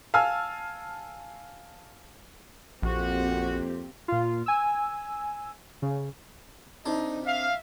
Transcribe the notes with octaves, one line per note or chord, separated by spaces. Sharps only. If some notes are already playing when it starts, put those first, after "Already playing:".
F5 G#5 A5 E6 F6
A#1 F2 A#3 C4 F#4 G4
A#2 F4
G#5 E6
C#3
C3 D4 D#4 A4
E5 F5